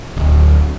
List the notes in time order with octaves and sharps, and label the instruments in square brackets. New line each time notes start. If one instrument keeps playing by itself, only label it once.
[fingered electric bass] D1